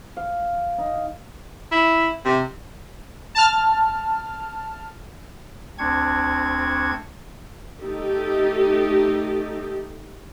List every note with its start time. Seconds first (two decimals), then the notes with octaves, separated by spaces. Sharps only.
0.17 F5
0.78 D#4
1.72 E4
2.25 C3
3.35 A5 F6
5.78 D2 C4 D4 C#6 G#6
7.81 A3 D#4 G4 A4